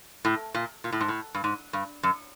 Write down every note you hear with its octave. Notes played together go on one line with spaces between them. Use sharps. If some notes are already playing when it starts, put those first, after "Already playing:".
A2
A#2
A#2
A2
G#2
A2
G2
G#2
G2
F#2